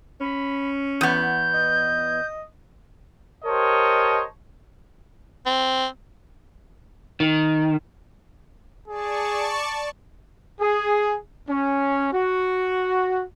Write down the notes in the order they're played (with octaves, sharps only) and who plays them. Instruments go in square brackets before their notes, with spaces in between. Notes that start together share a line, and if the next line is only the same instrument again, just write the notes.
[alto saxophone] C#4 [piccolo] B5
[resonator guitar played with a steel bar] E2 B3 [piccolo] G6
[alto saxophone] D#5
[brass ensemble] G4 A#4 C5 C#5 D#5 A5
[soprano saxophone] C4
[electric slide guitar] D#3
[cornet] G#4 [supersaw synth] D5 A5 C#6
[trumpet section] G#4
C#4
F#4